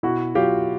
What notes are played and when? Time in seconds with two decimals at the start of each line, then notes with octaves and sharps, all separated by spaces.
0.03 B2 E4 F#4
0.35 F#3 F4 G4